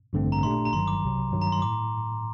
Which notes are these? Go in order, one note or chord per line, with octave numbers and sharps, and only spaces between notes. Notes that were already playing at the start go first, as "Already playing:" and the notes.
A1 G2 D3 A3 C4
A#5
A#2 A3 D4 G4 C6
A#5
G1 G2 D#3 F#3 C6
D6
C2 C3 F#3
G2 D#3 F#3
A#5
C6
A2 D6